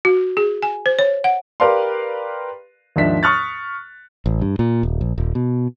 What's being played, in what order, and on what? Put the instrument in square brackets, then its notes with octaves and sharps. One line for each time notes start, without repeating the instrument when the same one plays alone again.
[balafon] F#4
G#4
G#5
C5
C#5
F#5
[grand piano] G4 A#4 B4 D5 F5 C6
D#2 G#2 F3 D4 E5 B6
C#6 D#6 F6 F#6 A6
[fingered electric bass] A1
G2
A#2
D#1
A#1
D#1
B2